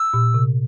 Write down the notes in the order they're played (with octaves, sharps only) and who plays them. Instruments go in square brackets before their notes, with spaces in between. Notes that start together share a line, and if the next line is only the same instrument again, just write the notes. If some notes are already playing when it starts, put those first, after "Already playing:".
Already playing: [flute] E6
[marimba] A#2
C3